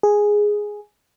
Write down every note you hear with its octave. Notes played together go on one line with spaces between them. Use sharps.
G#4